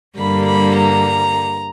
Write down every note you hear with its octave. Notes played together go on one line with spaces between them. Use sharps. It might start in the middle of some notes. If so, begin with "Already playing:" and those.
G2 D3 G3 A#3 B5
B5
A#5